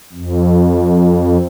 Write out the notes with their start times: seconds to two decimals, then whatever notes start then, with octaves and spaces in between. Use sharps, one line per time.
0.12 F2